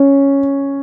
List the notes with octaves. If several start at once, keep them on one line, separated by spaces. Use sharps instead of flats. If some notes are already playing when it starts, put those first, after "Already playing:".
Already playing: C#4